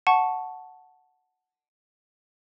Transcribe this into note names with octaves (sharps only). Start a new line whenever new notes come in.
F#5 A5 C#6